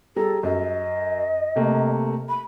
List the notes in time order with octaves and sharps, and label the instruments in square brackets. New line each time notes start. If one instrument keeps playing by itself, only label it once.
[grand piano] G3 G#4 A#5 [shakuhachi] A4
[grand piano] F#2 [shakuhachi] D#5
[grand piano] C3 A3 A#3
[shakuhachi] B5